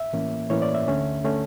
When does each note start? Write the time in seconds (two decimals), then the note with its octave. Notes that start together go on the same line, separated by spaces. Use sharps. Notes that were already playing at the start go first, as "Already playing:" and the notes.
Already playing: E5
0.13 A2 E3 A#3 C#4
0.50 A2 E3 A#3 C#4 C#5
0.62 D5
0.74 E5
0.88 D2 D3 A3 C#4
1.24 D3 A3 C#4